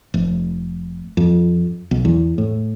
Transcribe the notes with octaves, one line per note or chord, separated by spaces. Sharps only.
F1
F2
B1
E2
A2